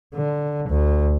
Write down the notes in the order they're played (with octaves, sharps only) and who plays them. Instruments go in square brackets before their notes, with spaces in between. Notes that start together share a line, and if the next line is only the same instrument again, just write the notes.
[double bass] D3
D2